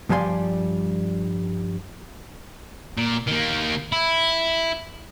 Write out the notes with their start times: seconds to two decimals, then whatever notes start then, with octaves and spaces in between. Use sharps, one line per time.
0.09 G2 F3 G3 G#5 C6
2.97 A#2
3.27 D#3 A#3
3.92 E4